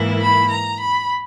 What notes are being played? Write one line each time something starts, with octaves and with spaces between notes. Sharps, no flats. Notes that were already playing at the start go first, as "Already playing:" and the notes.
Already playing: G#2 E3 A#3 E4
B5
A#5
B5